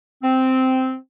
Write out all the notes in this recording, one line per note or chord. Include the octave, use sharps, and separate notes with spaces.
C4